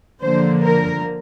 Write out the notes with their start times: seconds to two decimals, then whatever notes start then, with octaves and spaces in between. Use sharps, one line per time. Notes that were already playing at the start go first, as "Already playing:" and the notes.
0.21 D3 F3 A#3 C5
0.61 A#4